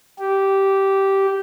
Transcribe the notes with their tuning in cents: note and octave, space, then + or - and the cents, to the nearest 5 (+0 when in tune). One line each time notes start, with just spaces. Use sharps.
G4 -10